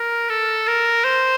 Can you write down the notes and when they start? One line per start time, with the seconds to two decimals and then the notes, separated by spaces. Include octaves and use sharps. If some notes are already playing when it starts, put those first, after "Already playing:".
Already playing: A#4
0.29 A4
0.67 A#4
1.05 C5